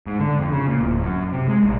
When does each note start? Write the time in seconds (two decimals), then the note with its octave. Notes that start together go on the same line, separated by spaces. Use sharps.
0.06 G#2
0.19 D3
0.39 F2
0.52 C#3
0.68 A#2
0.81 D1
1.01 F#2
1.32 C3
1.48 G#3
1.63 A#1